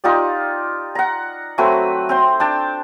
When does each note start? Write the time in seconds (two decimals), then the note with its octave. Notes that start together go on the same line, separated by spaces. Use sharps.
0.04 D#4 F4 G4 D5
0.95 F#5 A#5
1.58 F#3 A3 C4 B4
2.09 C4 G5 C6
2.40 D4 G5 A5